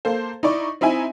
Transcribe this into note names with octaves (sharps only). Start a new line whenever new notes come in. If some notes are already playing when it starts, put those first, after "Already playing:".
A#3 A4 C5
D#4 E4 D5 C#6
C4 D#4 E4 E5 G#5